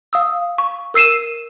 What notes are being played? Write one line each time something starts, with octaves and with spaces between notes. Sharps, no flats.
F5 D#6 E6
C#6
A#4 E6 C7 D#7 E7